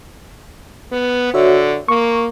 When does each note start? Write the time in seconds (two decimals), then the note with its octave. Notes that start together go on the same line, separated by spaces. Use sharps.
0.92 B3
1.34 D3 F#4 C#5 E5
1.88 A#3 C#6